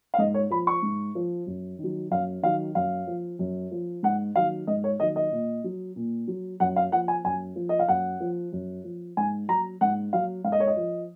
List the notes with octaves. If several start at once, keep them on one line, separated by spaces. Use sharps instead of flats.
F5
G#2 D#5
C#5
F3 B5
C#6
G#2
F3
F#2
D#3
F#3
F#2 F5
D#3 F#3 F5
F#2 F5
F3
F#2
F3
G#2 F#5
D#3 F#3 F5
G#2 D#5
C#5
D#3 F#3 D#5
D#5
A#2
F#3
A#2
F#3
F#2 F#5
F5
F3 F#5
G#5
F#2 G#5
F3
D#5
F5
F#2 F#5
F3
F#2
F3
G#2 G#5
F#3 A#5
G#2 F#5
F#3 F5
G#2 F5
D#5
C#5
D#5
F3